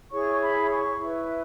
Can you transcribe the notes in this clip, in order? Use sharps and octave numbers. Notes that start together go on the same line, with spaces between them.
E4 G#4 C#5 C#6
C#6
B5
C#6
E4 B4